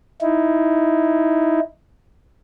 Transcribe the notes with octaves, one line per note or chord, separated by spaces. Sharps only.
D#4 E4